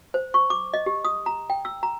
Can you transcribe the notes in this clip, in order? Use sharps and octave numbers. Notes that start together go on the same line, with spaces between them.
C5
C#6
D6
D#5
G4
D#6
A#5
G5
E6
A#5